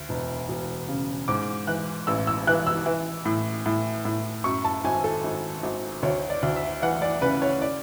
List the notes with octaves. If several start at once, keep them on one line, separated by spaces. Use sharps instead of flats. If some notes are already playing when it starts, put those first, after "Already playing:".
Already playing: D2
E1
E1
C#3
G#2 D6
E3 F#6
A1 E6
E6
E3 F#6
E6
E3
A2
A2
A2
F#2 C#6
A5
G#1 G#5
A4
G#1
G#1
D2 C#5
D5
D2
E5
E3 F#5
D5
C#3 B4
C#5
D5